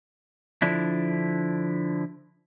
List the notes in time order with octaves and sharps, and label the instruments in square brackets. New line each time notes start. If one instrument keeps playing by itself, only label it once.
[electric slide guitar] D3 F3 D4 E4